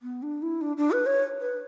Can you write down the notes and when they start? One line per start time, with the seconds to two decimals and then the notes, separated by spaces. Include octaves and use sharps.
0.02 B3
0.22 D4
0.42 E4
0.61 D4
0.77 D4
0.91 B4
1.06 C#5
1.41 B4